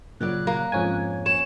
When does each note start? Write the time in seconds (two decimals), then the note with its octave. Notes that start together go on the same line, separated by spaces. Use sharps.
0.21 A#2 C#3 F#3 D5 F#6
0.47 A#3
0.72 F2 G#2 C#4 G#5
1.26 C#5 E7